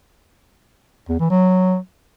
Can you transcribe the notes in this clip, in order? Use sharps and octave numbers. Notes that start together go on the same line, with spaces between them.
E2
E3
F#3